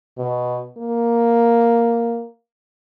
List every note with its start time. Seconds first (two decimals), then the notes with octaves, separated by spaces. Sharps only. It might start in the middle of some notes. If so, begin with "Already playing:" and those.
0.18 B2
0.78 A#3